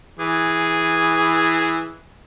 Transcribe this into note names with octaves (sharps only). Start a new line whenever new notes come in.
E3 G#4